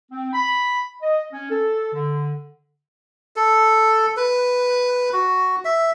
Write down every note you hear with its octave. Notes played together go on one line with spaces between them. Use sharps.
C4
B5
D#5
C#4
A4
D3
A4
B4
F#4
E5